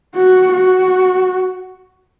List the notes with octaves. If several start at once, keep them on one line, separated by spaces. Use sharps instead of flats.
F#4
F#4